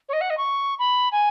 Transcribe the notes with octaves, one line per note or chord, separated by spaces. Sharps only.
C#5
D#5
F#5
D#5
C#6
B5
G#5